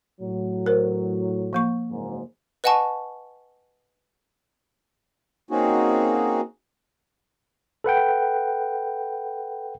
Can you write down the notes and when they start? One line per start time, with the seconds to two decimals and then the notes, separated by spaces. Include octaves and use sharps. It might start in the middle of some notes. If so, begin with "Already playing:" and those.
0.21 A2 F#3
0.66 A#4 C5
1.53 F3 A#3 C#6
1.90 F#1 G#2
2.64 B4 D#5 F#5 G#5 A5 C#6
5.51 A#3 C4 C#4 D#4 F#4 G#4
7.84 A4 B4 F#5 G5